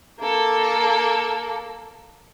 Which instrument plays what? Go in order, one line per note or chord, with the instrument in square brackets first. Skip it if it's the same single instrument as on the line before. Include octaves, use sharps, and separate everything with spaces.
[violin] A#3 A4